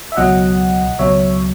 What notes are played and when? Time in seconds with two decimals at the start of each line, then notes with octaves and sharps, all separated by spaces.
0.12 E5
0.17 C#2 B2 F#3 D#5 F#5
0.99 C#2 B2 F#3 C#5 E5